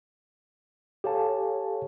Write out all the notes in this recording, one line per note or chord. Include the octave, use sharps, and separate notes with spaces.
G4 A4 C#5 F5 G#5 A5